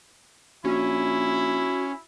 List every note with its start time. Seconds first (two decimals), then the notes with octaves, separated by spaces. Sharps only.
0.65 A#1 C#4 E4 F#4